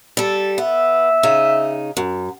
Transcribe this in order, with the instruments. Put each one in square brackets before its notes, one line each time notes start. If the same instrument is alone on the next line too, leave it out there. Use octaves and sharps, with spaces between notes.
[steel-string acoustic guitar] G3 A4
[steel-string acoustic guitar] B3 [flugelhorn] E5
[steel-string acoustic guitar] C#3 D#4
F#2